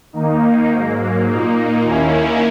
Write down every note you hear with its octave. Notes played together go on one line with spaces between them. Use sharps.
D#3 A#3 D#4
G#2 F#3 A#3
A#2 A#3 D#4
D#2 D#3 A#3 C#4 E4